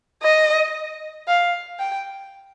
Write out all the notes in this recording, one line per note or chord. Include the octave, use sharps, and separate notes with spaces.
D#5
F5
G5